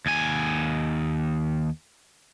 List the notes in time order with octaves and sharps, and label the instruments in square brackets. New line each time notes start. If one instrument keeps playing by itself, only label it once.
[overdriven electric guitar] D#2 G#5